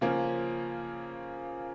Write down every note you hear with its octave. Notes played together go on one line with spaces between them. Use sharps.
C#3 F3 A#3 C#4